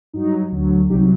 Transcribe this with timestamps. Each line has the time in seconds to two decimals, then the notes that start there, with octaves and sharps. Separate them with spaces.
0.13 G2 F#3 D#4
0.52 D2 D3 F#3
0.90 C2 C3 F#3 D#4 G4